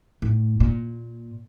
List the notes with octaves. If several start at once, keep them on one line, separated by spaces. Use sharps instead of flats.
A2
A#2